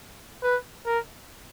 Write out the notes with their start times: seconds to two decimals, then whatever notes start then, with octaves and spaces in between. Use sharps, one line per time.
0.43 B4
0.86 A#4